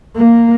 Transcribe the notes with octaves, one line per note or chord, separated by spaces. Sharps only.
A#3